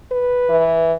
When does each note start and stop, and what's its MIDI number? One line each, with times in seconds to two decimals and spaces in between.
0.12 0.73 71
0.49 0.94 52